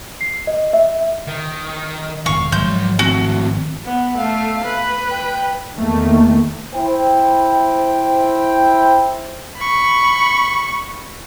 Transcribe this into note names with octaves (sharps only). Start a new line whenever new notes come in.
C7
D#5
E5
D#3
E1 A#1 D#3 F5 C#6
G#1 F3 F#3 G#3 C6 G6
A2 C4 F#4
B3
A3 F5
B4
G5
E2 D#3 A3 A#3
E4 C5 G5
B5 C#6